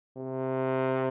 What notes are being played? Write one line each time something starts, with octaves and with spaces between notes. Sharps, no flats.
C3